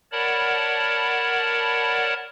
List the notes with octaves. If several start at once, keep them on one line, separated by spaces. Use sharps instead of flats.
A#4 C#5 D5 F#5 A5 B5